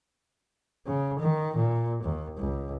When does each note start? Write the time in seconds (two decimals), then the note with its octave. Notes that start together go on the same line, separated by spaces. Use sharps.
0.86 C#3
1.20 D#3
1.57 A#2
2.04 D#2
2.38 C#2